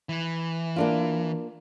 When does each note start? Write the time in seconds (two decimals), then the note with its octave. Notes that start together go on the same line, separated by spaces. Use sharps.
0.09 E3
0.76 A#3 D4 F4